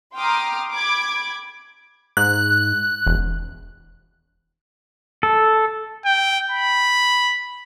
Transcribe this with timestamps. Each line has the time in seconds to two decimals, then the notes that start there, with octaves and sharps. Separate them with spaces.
0.17 G5 A#5 C6 D6 D#6 F6
0.74 B5 D6 G#6
2.17 G#2 F#6
3.06 E1
5.23 A4
6.05 G5
6.51 B5